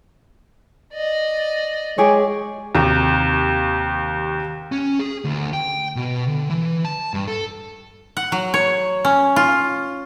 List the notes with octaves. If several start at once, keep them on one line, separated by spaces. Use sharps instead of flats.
D5 D#5
G#3 G4 G#4 C#5
D#2 C3 A#5
C#4
G#4
D2
G5
B2
D3
E3
A5
G2
A4
F#5
F#3
C#5
C#4
F4